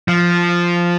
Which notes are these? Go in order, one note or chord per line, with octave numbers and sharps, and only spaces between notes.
F3